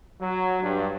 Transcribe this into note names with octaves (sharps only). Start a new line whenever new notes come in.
F#3
G2